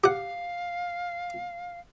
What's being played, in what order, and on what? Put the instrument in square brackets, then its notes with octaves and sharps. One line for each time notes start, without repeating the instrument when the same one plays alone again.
[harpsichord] G4 F#5 [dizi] F5